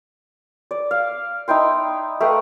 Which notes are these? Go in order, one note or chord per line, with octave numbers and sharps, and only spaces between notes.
D5
F5
D#4 E4 G5 C6
A3 B4 F5 G5